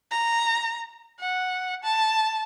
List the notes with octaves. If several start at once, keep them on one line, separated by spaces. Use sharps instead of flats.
A#5
F#5
A5